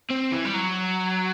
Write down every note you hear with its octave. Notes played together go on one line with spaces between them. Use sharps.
C4
E3
G3
F#3